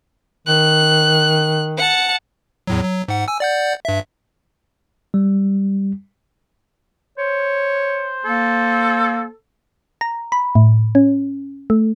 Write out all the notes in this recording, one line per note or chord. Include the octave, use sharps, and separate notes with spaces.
D#3 F#6
F#5 A5
E2 A2 F#3
F#3
G#2 F#5
G#5 E6
D5 F#5 G6
G2 E5
G3
C5 C#5
A#3 A4
A#5
B5
A2
C#4
A3